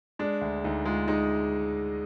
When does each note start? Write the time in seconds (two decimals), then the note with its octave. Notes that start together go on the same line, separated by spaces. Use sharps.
0.19 G#3 D4
0.41 D2
0.64 D2 D#4
0.86 G#3 F4
1.08 G#3 D#4